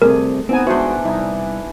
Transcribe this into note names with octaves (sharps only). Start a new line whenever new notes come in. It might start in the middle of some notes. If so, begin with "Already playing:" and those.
C2 A2 C3 A3 G#4 A#4
B3 C4 D#4 G#5
E3 G#3 D4 F#4 C5
C2 D#4 E4 G#5